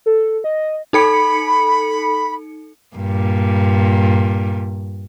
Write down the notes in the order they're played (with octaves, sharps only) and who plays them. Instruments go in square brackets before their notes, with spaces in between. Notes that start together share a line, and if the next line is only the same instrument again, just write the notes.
[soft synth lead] A4
D#5
[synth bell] D#4 A4 C#7 [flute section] B5
[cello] G2 A#2